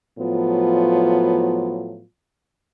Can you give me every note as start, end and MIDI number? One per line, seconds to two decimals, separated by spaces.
0.19 2.04 45
0.19 2.04 53
0.19 2.04 54
0.19 2.04 59
0.19 2.04 65